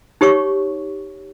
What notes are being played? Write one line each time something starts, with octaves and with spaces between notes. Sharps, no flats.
D#4 G4 C#5 C#6 D6